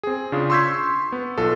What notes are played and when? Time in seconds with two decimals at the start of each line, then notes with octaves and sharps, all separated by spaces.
0.03 C4 G#4
0.32 C#3 D4 F4
0.50 C6 C#6 E6 G6 G#6 B6
1.12 B3
1.38 B1 F4 A4